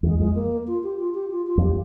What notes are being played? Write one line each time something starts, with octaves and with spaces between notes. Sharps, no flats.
E2 G#3
F2 G#3
A#3
F4
G4
F4
G4
F4
F4
F2
G4